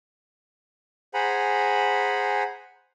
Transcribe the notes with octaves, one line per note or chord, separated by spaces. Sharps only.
G#4 C5 F#5 G#5 A#5 B5